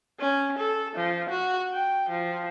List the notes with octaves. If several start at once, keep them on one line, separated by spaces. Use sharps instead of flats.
C#4
A4
F3
F#4
G5
F3